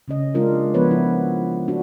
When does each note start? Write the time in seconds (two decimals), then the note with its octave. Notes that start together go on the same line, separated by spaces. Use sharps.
0.08 C#3 C#4 D#5
0.34 G#3 D4 F4 A#4
0.74 F3 B3 B4 C#5
0.91 E4
1.68 D4 F#4